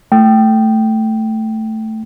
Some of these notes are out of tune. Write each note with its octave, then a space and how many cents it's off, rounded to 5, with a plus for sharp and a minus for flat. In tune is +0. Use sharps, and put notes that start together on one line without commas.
A3 +0 G5 -10